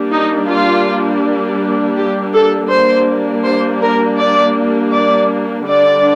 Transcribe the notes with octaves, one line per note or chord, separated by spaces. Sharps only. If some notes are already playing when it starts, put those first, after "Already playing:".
Already playing: G3 A#3 D4
D#4
F4
G4
A4
G3 A#3 D4 C5
C5
A#4
D5
D5
D3 G3 D4 D5